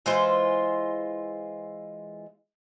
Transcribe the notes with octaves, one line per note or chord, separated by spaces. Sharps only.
E3 G#3 F4 C5